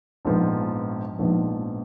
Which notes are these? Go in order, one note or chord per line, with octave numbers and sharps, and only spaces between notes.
A#1 G#2 F3 B3
A#1 G#2 F3 B3